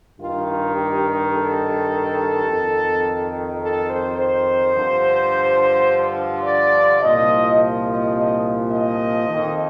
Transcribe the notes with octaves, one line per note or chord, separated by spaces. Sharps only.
G2 D#3 F4
F4
G4
A4
F2 D#3
A4
C5
C5
G2 D3 F3
D5
C2 A#2 F3 D#5
D#5
D#5
D#5
D#5
F2 D#3